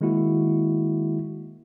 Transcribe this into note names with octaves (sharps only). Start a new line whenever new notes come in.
D#3 G#3 A#3 E4 F#4